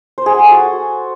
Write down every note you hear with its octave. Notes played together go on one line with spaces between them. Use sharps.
C5
G#4
F#5
A4
F#4